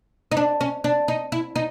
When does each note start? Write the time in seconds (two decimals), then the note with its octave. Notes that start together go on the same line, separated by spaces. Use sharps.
0.31 D#4
0.37 D4
0.61 C#4
0.84 D4
1.08 D#4
1.32 E4
1.56 D#4